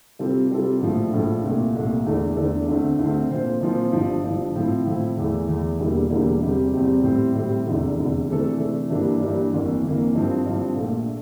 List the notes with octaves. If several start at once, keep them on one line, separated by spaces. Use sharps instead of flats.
C3 G3 C4 F4 A4
C3 G3 C4 F4 A4
A#1 A2 F3 A3
A#1 A2 F3 A3
C2 A#2 A3
C2 A#2 A3
E2 D3 A3 D4 A4
E2 D3 A3 D4 A4
D2 D3 A3 C4
D2 D3 A3 C4
A#2 F3 C4 F4 C5
A#2 F3 C4 F4 C5
G1 G2 F3
G1 G2 F3
A2 F3 C4 E4
A2 F3 C4 E4
E2 E3 A3
E2 E3 A3
E1 E2 D3 G3 A#3
E1 E2 D3 G3 A#3
E2 C3 G3 C4
E2 C3 G3 C4
A2 G3 C4
A2 G3 C4
F1 E2 D3
F1 E2 D3
C3 E3 A3 D4 A4
C3 E3 A3 D4 A4
G2 E3 G3 A#3 D4
G2 E3 G3 A#3 D4
G1 F2 E3 A#3
G1 F2 E3 A#3
G2 F3 C4
G2 F3 C4
A#1 A#2 A3